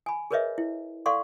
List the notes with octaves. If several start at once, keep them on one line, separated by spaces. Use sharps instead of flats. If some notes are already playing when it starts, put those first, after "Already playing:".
G#5 B5
G#4 A#4 B4 C#5 D#5 E5
E4
A4 D5 F5 F#5 C6 C#6